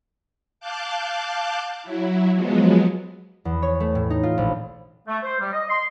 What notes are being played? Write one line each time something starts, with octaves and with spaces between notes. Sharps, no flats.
F5 A5 D6 F#6 G6
F#3 E4
F3 F#3 G#3 B3
E2
C#5
A3
A2
D#4
F4
A#1
A3
C5
G3
D#5
C6